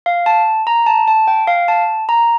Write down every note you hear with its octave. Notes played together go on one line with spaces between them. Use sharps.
F5
A5
A#5
A5
A5
G5
F5
A5
A#5